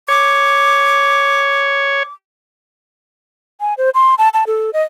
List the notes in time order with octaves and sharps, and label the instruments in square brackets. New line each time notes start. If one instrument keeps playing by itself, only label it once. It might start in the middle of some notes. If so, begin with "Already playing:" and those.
[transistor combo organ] C#5 [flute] D6
[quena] G#5
C5
C6
A5
A5
A4
D#5